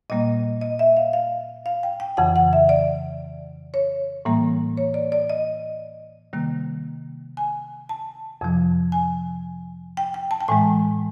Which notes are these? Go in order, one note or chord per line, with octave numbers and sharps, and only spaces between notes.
A#2 G3 A#3 D#5
D#5
E5
F5
F5
F5
G5
G5
F2 C#3 E3 F#5
F#5
E5
D5
C#5
A2 E3 G3 A#3
C#5
D5
D5
D#5
C3 D#3 G3 A#3
G#5
A5
F2 C3 F3
G#5
G5
G5
A5
G5
A2 E3 G#3 G#5